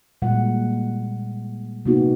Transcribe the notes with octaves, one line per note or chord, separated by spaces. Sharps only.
A#2 G3 G#3 F#5
C3 A#3 B3 D#4 F#4 G4